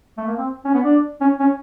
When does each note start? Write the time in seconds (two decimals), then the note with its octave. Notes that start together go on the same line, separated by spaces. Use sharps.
0.18 A3
0.27 A#3
0.37 C4
0.65 C#4
0.74 B3
0.84 D4
1.21 C#4
1.40 C#4